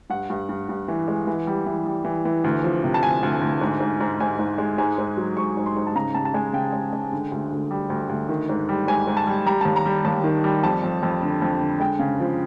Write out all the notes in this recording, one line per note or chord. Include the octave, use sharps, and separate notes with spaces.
G2 F#5
G2
G2
G2
E3
G#3
E3
G3
E3
G3
E3
E3
D2
F3
C3
A5
D2 G#5
D2
D2
G#2
G#2
G#2
G#2 G#5
G#2
G#3
G#2 G#5
G#2
F#3
G#2 C#6
G#2
C6
G#2
A5
C#3 A#5
C#3 A5
A5
G#3 G#5
C#3 G5
G#3
G#3
D3
D2
D2
G3
D2
D2
D#3
G#2
G3
G#2 G#5
G#2
A5
G3
G3 A#5
D#2 A5
A#5
G3
D#2 A5
D#3
G3
F2 A5
F2
F2
D3
F2
D3
G#3 G5
C#3
F3